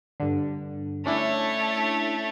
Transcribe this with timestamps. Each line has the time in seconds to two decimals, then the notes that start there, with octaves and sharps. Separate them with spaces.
0.20 G2 D3
1.06 A3 C#4 D4 E4 C#5